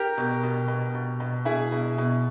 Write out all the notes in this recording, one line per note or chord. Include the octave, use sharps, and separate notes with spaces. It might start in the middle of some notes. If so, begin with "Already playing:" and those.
Already playing: G4 A#4
B2
B2
B2
B2
B2
B2 E4 G#4
B2
B2